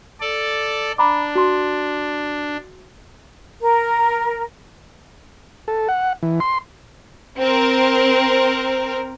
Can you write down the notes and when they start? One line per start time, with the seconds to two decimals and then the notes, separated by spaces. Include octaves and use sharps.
0.21 A4 D5
0.98 D4 A#5 B5 D6
1.35 F#4 C6
3.61 A#4
5.68 A4
5.88 F#5
6.23 E3
6.40 C6
7.39 C4 A#4